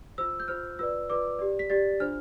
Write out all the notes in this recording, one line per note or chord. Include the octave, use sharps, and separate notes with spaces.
F4 C5 E6
G6
F4 C5 F6
F4 B4 D5 E6
F4 B4 D5 D6
G4 D5
B6
G4 D5 A6
D4 F4 C5 F6